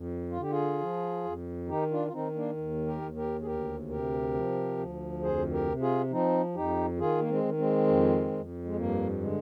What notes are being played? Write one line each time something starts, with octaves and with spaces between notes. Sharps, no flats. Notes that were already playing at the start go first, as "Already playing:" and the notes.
Already playing: F2
F4
D3 G4
F4 G#4
F3
F2
D#3 D#4 G4
D4 F4
F4
D#3 C4 D#4
A#3 D4
D#2
G4 A#4
D#2
G4 A#4
G#4
D2 G4 A#4
C3 G4 A#4
F3
D2
F2 G#4 C5
G4 A#4
C3
F4 G#4
F3 C4 D#4
F2 D#4 G4
D#3 F4 G#4
A#3
G#3 C4
D#3
G#3 C4
F2
F2
G#3
G2 A#3
D3 G#3